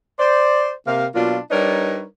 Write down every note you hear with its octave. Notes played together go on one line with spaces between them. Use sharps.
C5 D5
C3 A#3 F5
B2 F#3 A#3 D4 F4
G3 D4 D#4 A#4 B4 C#5